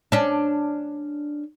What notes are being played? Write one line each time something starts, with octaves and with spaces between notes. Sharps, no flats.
C#4 D4